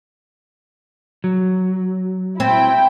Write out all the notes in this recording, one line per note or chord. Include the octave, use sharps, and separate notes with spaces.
F#3
C4 E4 G5